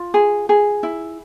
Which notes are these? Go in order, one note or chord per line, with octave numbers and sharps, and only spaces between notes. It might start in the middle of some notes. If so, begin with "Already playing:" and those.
Already playing: F4
G#4
G#4
E4